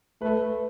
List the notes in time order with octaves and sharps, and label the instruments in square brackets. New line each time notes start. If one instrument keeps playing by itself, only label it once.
[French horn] A3 [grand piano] B4